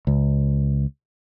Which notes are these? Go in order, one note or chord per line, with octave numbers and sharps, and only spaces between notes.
C#2